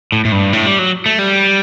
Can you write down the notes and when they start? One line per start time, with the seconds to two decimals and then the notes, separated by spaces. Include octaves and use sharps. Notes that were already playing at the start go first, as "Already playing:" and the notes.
0.12 A2
0.25 A2
0.32 G2
0.53 A2
0.66 G3
0.79 F#3
1.06 A3
1.19 G3